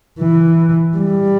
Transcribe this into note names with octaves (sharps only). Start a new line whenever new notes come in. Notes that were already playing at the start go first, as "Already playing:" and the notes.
E3
G3